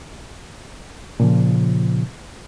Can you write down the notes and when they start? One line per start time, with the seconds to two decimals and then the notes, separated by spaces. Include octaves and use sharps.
1.20 A#2 C#3 F3